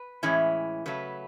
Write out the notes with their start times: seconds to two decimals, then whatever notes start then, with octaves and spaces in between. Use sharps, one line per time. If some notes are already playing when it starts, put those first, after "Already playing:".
Already playing: B4
0.23 A2 E3 G#3 C#4 E4
0.86 C#3 F#3 A3 B4